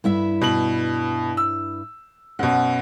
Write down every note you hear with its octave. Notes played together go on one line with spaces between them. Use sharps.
G2 E4 E5
B2 F#7
E6
F#2 B2 F#5